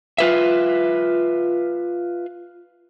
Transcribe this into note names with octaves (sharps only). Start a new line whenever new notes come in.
F4 B4 E5